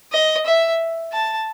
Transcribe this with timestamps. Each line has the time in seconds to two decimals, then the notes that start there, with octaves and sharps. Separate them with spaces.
0.13 D#5
0.46 E5
1.13 A5